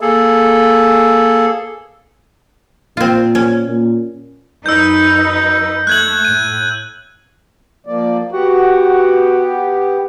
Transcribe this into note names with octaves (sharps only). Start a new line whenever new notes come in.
A#3 G#4 A4
A#2 C4 F4
C#4
A#2
F#2 D#4 B4 E6 G6
A3 F#6 G#6 F#7
A2 D#7
F3 A#3 D5
B3 F#4 G4